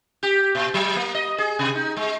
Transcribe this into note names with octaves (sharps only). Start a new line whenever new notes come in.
G4
A#2
F#3
A#3
D#5
G#4
C3
D#4
G#3